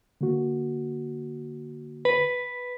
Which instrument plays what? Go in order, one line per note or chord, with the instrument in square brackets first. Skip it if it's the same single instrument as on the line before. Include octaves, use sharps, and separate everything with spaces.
[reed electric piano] D3 A#3 F#4
[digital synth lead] B4